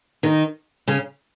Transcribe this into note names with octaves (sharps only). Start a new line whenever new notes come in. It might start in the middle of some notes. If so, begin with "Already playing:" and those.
D#3 D#4
C#3 C#4